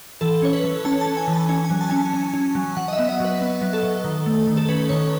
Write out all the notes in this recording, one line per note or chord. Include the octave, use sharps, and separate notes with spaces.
E3 A4
C#4 C#5
B4
E3
C#4 A5
C#4 A5
G#5
E3
A5
C#4 G#5
G#5
F#3
A5
C#4 G#5
A5
C#4
C#4
F#3
F#3 F#5
D#5
E5
B3
D#5
F#3 B4
B3
F#3
A4
F#3
D#3
A3
D#3
A4
C#4 B4
D#3 C#5